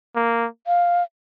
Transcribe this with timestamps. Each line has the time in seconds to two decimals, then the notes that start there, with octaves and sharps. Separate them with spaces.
0.16 A#3
0.67 F5